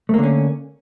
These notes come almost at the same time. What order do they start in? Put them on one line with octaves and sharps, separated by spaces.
A3 A#3 D3 C#4